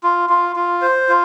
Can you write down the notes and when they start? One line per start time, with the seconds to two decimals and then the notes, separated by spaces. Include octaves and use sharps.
0.03 F4
0.30 F4
0.56 F4
0.82 C5
1.09 F4